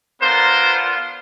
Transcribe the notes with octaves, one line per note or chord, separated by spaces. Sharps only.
B3 D4 F4 A#4 C5